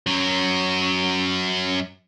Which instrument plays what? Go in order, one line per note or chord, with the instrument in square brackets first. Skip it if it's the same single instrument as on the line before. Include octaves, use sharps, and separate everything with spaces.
[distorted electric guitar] F#2 F#3